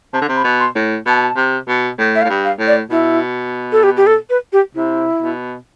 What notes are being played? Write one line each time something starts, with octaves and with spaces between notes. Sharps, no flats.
C3 A5
D3
C3
B5
B2
C6
A2
B2 A5
C3
B2
A2
E5
F5
A2
G2
F5
A2
D5
B2 E4
A4
G4
G4
A4
B4
G4
C3 E4
B2